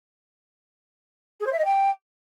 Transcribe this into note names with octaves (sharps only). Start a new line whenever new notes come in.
G#4
C5
E5
D#5
G5